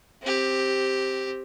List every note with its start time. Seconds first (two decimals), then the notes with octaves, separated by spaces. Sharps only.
0.22 C4 G4